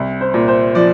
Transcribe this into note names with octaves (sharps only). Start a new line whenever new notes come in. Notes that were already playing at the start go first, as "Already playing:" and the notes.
Already playing: C2
C5
A#2
C5
F3 D5